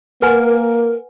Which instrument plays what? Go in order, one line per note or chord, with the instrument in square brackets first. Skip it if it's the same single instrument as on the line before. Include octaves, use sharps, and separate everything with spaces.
[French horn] A#3 [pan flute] A#4 [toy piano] B4 F#5 G#5